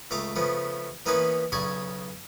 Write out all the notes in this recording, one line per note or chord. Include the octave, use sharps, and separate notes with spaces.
C#2 A3 A#5 D6 D#6
C#3 F3 A3 B3
E3 A#3 B3 C#4 D#4 B4
B1 C#3 C#5 D5 G#5 C#6